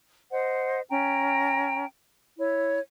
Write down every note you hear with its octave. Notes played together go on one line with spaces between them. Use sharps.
C5 D#5 F#5
C#4 G5 A#5
E4 C#5